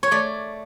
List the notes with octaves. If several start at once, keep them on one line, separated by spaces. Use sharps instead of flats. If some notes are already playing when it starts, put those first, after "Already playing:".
C#5
A3 D5